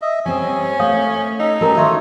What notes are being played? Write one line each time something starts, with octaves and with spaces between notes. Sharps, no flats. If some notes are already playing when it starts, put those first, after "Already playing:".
D#5 E5
G3 C4 C#4 G#5
A3 C#5 F5 D#6
D#4 A4
G3 C#4 F#4 A#4 B4 A5 A#5
D#3 F4 A4 A#4 C#5 D#5 E5 C#6